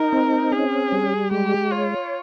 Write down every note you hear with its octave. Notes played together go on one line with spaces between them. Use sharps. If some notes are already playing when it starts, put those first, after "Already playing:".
Already playing: D#4 A#4
C4
C#4 G#4
G3
G#3 G4
F4 C#5